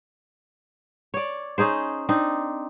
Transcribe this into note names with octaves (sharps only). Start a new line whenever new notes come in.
C#5 D5
C#4 D#4 G#4 C5
C4 D4 D#4